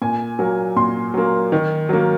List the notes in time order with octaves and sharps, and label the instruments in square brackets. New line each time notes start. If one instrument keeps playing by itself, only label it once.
[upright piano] A#2 G#5
F#3 A#3
A#2 C6
F#3 A#3
D#3
F#3 A#3